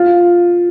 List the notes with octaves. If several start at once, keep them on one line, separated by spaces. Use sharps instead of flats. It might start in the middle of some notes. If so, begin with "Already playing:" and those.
Already playing: F4